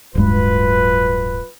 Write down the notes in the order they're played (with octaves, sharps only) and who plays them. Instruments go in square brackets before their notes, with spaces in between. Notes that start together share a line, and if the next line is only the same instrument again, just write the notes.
[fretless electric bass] D1 G2 G#3 [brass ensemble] F#3 F4 B4